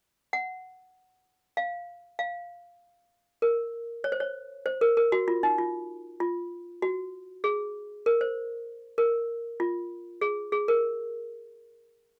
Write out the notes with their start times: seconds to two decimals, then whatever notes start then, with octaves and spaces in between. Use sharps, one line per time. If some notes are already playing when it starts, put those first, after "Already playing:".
0.33 F#5
1.57 F5
2.19 F5
3.42 A#4
4.04 C#5
4.12 C5
4.20 C#5
4.66 C5
4.81 A#4
4.97 A#4
5.12 F#4
5.28 F4
5.43 D#4
5.58 F4
6.20 F4
6.82 F#4
7.44 G#4
8.06 A#4
8.21 C5
8.98 A#4
9.60 F4
10.21 G#4
10.52 G#4
10.68 A#4